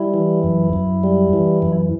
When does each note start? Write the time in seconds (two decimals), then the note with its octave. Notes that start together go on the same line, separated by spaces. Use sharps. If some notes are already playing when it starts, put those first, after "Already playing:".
Already playing: G3 E4
0.14 E3
0.43 F#2
0.73 F#2
1.03 G3
1.33 E3
1.62 F#2